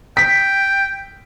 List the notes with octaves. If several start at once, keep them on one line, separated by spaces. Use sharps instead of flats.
G5 B6